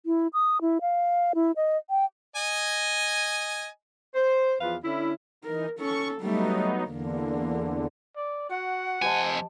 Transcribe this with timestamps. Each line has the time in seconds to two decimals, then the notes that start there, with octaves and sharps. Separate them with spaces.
0.06 E4
0.33 D#6
0.61 E4
0.81 F5
1.35 E4
1.56 D#5
1.90 G5
2.36 D#5 G#5
4.14 C5
4.60 E2 F3 F4 B4 F5
4.83 D3 C#4 E4
5.44 E3 D#4 A#4
5.79 C#4 A4 C#6
6.22 F#3 G3 A3 B3 D#4
6.84 E2 D3 A#3
8.16 D5
8.49 F#4 F#5
9.02 F2 G4 C5 D#5 G#5 A5